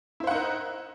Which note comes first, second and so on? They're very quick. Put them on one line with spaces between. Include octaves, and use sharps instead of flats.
E4 C5 F#5 D#4 A#4